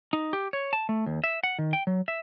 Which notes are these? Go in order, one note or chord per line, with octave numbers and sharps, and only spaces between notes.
D#4
G4
C#5
A5
A3
D#2
E5
F#5
D#3
G5
F#3
E5